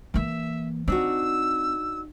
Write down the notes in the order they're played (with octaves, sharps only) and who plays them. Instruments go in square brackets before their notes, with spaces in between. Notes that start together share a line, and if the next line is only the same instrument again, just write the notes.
[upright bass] E3 A#3 [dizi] E5
[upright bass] C4 [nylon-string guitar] D4 D#4 F#4 [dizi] E6